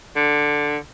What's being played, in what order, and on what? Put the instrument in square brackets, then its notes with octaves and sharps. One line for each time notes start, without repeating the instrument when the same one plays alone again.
[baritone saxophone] D3